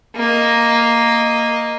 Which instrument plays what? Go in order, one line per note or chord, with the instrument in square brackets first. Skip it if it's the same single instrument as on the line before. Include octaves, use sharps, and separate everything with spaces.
[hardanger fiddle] A#3 D#5